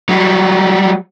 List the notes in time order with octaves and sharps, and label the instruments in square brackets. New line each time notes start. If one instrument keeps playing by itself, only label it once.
[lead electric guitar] F#3 G3